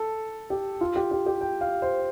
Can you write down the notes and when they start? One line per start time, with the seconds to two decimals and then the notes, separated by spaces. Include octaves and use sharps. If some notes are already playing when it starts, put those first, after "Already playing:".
Already playing: A4
0.50 G4
0.81 F4
0.96 G4
1.11 G4
1.26 G4
1.41 G5
1.61 F5
1.82 C5